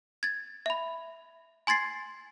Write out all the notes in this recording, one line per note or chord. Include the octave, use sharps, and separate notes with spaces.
G#6 A6
E5 B5
G#5 C6 G#6 A6 C7